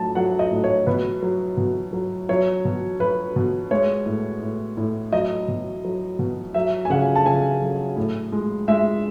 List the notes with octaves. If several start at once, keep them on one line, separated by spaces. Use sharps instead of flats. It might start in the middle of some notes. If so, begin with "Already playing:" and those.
Already playing: A2 F#3 A5
F#3 F#5
D#5
A2
C#5
B2 B4
F#3
B2
F#3
F#3 C#5
B2
F#3 B4
B2
G#3 C#5
A2
A2
A2
F#3 D#5
B2
F#3
B2
F#3 E5
G#5
C#3 F#5
A5
C#3 G#5
F#3
A2
G#3
G#3 E5